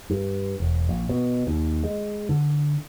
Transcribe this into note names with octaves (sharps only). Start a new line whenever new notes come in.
G2
E1
A#1
B2
D#2
G#3
D3